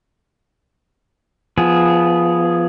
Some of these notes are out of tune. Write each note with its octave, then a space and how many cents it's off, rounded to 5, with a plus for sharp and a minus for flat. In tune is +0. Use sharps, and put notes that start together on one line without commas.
F3 -15 B3 +0 G#4 +0